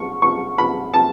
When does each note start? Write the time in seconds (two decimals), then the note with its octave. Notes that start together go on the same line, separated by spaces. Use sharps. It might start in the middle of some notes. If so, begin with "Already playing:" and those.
Already playing: C#6
0.22 C#6
0.58 B5
0.94 A5